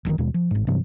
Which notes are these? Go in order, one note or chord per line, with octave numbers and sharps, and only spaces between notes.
F#1 F#2 A#2 D#3
D#2 B2 G#3
F3
A1 G#2
G2 C3 E3 F#3